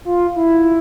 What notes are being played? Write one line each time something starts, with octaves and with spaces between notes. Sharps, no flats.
F4
E4